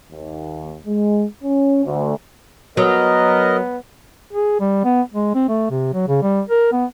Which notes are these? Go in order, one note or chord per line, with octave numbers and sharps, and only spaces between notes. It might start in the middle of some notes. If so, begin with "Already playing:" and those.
D#2
G#3
C#4
D2
F#3 B3 A#4 D#5
G#4
G3
B3
G#3
C4
A3
C3
F#3
C#3
G3
A#4
B3